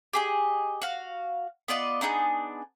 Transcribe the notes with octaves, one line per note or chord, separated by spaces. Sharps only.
G4 G#4 D#5
F#4 F5
B3 F4 D5 D#5
B3 D4 D#4 G#4